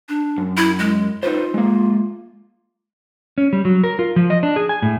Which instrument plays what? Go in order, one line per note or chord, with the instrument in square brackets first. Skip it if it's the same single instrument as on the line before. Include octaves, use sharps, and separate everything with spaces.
[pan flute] D4
[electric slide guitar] F#2
[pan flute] E4
G#3
[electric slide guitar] D#4 B4 C5 [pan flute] F4
[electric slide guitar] G#3 A#3
C#4
G3
F#3
A#4
F4
F3
D#5
D4
G#4
G#5
A2